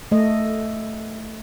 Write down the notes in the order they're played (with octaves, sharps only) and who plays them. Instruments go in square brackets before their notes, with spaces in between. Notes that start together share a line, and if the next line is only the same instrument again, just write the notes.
[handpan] A3 D#5